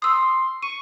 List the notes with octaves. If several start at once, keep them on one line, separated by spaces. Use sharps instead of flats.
C6 D#6 E6
C#6 D#7